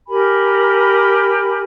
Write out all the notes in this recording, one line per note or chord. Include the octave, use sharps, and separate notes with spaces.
G4 A#4 G#5 B5